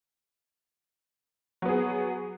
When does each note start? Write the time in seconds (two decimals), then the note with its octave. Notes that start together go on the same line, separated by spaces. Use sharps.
1.62 F#3
1.65 B3
1.69 G#4